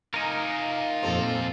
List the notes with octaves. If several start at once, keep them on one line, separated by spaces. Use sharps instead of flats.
D#4 F4 A#4 G#5
F2 A#2 C4 A4